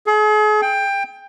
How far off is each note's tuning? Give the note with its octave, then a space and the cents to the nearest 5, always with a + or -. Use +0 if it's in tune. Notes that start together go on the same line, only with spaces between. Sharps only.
G#4 +40
G5 +20